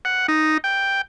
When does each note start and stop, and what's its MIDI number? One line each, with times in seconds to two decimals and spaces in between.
0.05 0.27 78
0.28 0.58 63
0.64 1.01 79